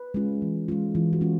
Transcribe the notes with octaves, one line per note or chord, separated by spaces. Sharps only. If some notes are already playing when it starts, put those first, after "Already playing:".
Already playing: B4
G#3 C#4 F4
E3
G#3 C#4 F4
E3 F4
F#4
G#3 C#4 F4